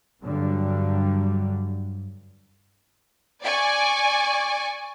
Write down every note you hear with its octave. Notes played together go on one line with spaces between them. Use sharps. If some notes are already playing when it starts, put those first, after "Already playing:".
G2 D3 F#3 G3
D5 G#5 C#6